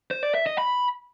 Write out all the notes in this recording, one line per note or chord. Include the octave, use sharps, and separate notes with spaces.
C5
D5
E5
D#5
B5